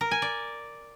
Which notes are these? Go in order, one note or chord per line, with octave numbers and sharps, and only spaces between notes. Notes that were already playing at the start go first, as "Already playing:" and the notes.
A#4
G#5
D5